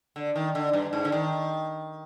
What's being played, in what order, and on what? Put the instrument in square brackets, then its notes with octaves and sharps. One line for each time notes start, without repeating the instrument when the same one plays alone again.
[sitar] D3
D#3
D3
G2
G#2
D3
D#3